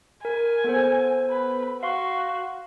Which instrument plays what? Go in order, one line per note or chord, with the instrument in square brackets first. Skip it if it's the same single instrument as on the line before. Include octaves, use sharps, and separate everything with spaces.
[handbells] A#4 [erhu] G#5
[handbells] B3 A4 C5
[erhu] B4
[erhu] F#4 [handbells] F5 C6 C#6